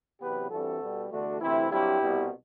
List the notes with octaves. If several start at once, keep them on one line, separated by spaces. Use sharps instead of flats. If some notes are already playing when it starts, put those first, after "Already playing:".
E2 C3 F#3 B3 G4 B4
G2 E3 G3 C4 F#4 A4
B2 G3 B3
E2 D3 A3 D4 F#4
D2 C3 E3 C4 E4
G2 F#3 C4 E4 G4
C2 B2 G3 B3